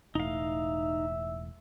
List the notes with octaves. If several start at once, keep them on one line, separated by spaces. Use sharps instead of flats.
E1 A2 D#4 E5 F5